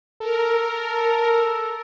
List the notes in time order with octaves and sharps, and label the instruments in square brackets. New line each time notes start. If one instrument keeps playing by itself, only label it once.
[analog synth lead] A4 [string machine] A#4